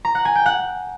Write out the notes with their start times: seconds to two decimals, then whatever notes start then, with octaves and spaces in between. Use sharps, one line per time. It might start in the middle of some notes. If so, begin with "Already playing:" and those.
0.05 A#5
0.15 F#5
0.25 G#5
0.35 G5
0.46 F#5